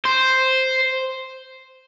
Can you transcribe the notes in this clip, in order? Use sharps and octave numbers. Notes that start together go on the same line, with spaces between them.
C5